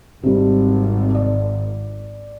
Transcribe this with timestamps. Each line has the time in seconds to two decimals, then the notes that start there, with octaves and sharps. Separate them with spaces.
0.23 G#1 C3 G3
1.15 D5